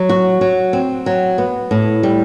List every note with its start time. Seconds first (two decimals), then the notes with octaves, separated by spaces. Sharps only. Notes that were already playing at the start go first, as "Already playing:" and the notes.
Already playing: F#3
0.09 F#4
0.41 F#3
0.73 C4
1.06 F#3
1.38 B3
1.71 A2
2.03 G3